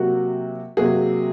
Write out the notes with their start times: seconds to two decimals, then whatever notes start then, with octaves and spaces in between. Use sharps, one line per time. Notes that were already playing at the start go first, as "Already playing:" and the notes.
Already playing: C3 F#3 A#3 F#4
0.77 C3 F#3 A#3 G#4